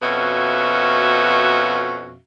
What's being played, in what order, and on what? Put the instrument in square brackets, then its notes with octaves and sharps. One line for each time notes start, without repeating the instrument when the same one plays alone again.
[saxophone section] F2 B2 C#4 F#4 E5 F5